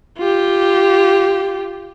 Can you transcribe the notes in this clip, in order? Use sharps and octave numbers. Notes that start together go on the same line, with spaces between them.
F4 G4